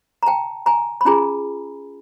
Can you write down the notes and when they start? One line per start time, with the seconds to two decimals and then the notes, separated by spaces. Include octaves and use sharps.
0.23 A#5
0.26 G5 A5
0.66 G#5 A#5
1.01 B5
1.05 C#4 F4 G#4 G#5 A#5